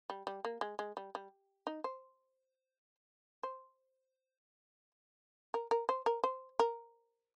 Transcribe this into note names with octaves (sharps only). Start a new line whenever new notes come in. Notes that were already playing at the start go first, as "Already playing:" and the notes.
G3
G3
A#3
G#3
G#3
G3
G3
D#4
C5
C5
A#4
A#4
C5
A#4
C5
A#4